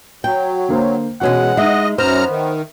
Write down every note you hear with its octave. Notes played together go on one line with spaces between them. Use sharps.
F#3 G5
D3 A#3 C5
B2 E3 G#3 C#4 F#4 G#4 F#5
G#3 D#4 D#5 E5
F#2 B3 C5 A#5 F6
D#3